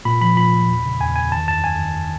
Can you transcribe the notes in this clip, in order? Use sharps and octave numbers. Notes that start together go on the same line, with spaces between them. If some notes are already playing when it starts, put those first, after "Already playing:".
A#2 B5
F3 B5
A#2 B5
A#2
E2
C#3
E2 G#5
E2 G#5
D#3 A5
F#2 A5
F#2 G#5
D#3